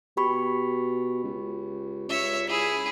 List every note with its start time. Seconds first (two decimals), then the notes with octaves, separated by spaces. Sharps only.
0.17 B2 G4 B5 C#6
1.24 C#2
2.09 C#2 C#5 E5
2.48 E4 G#4 B6